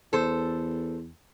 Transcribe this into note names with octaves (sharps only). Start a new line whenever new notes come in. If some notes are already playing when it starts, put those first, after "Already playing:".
E2 A4 C5